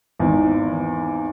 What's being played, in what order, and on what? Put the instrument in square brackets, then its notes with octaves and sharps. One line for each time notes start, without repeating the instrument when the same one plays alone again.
[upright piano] G#1 E2 G#2